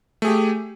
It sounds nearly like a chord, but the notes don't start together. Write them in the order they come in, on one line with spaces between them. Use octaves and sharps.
A3 G#4 G4